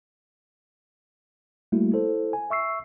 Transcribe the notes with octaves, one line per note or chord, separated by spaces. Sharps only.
G3 A3 A#3 E4 F#4
E4 A4 C5
G#5
E5 C#6 E6 C7